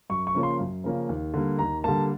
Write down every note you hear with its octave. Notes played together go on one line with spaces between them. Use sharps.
F#2 C#6
C#6
C#3 F3 A#3 C#4
C6
F#2
C#3 F3 A#3 C#4
D#2
D3 G3 A#3
D#2 A#5
D3 G3 A#3 A5